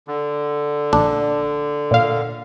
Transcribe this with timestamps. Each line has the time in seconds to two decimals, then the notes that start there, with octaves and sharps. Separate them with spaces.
0.08 D3
0.93 A#1 D4
1.91 A#2 F5